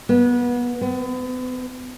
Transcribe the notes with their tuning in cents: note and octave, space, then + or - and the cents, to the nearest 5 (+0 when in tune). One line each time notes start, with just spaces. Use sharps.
B3 -25
B3 +40